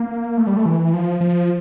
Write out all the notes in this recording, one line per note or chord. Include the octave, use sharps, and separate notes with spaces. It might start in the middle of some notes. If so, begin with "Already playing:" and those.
Already playing: A#3
A3
G3
A3
E3
F3
F3